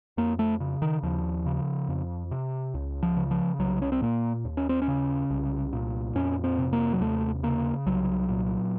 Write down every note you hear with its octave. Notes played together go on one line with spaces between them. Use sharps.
F2 A#3
A3
C#3
D#3
D#2 F3
C#3
F2
C3
C#2
F3
C#3
F3
C2 F#3
C#4
C4
A#2 A#3
D#2
C#4
C4
C#4
C#3
C2
A#2
F2 C#4
C4
C3
A#3
F#3
D#2 A3
C#3 A#3
C2 F#3
A#2